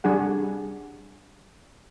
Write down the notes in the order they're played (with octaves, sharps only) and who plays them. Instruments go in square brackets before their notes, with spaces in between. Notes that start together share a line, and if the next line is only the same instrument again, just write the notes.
[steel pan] G3 D4 G#4 F#5